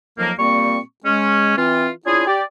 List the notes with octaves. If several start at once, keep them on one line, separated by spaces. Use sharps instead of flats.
F2 D#3 F3 F#3 A#3
A#2 G3 A#3 C4 C#6
G#3 C#4
E3 C4 F4
C#4 D4 E4 F4 G#4
G4 D5